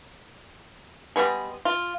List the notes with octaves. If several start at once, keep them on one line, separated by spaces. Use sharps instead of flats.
G3 G#3 B3 G#4
F4